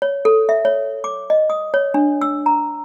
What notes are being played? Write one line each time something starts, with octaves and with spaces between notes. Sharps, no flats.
C#5
A4
E5
C#5
D6
D#5
D#6
C#5
D4
E6
A#5